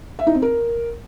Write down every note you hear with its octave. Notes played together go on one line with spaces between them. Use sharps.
E5
D#4
C4
A#4